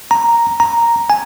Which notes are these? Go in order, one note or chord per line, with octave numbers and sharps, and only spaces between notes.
A#5
A#5
G#5